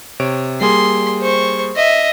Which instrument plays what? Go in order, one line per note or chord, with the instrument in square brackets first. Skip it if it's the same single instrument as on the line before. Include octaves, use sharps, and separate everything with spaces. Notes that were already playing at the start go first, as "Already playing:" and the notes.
[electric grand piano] C3 C#5 D7
[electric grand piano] G3 A#3 G#4 [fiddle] C6
[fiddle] C5 C#6
D#5 E5